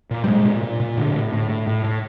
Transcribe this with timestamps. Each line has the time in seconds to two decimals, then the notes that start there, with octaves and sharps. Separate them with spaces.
0.11 A#2
0.24 G3
0.27 A#2 G#3
0.45 A#2
0.62 A#2
0.80 A#2
0.97 A2 D3
1.15 A2
1.33 A2
1.49 A2
1.67 A2
1.84 A2